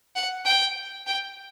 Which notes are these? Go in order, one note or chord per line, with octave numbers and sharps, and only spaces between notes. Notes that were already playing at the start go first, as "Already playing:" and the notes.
F#5
G5
G5